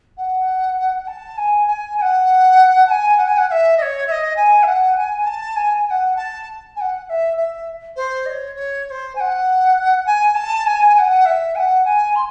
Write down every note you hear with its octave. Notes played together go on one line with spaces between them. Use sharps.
F#5
A5
G#5
G#5
G#5
F#5
A5
G#5
F#5
G#5
F#5
F#5
E5
D#5
C#5
E5
D#5
G#5
E5
F#5
G#5
A5
G#5
G#5
F#5
A5
G#5
F#5
F#5
E5
E5
C5
D#5
C#5
C#5
C#5
C5
G#5
F#5
G#5
A5
G#5
G#5
F#5
E5
G#5
F#5
G#5
C6